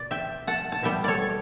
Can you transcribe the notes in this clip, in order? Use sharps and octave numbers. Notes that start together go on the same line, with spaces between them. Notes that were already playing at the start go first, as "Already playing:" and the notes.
Already playing: B2 D5
E5 G5
F#5 A5
A5
B2 G3 B3 E5 G5
A4 C#5 D5